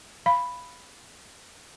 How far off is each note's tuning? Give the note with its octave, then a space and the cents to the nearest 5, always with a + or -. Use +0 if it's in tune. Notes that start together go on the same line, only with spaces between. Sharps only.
F5 -10 B5 +0